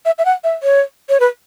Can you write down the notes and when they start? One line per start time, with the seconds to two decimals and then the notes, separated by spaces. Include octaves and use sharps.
0.05 E5
0.18 E5
0.25 F#5
0.44 E5
0.63 C#5
1.09 C#5
1.20 B4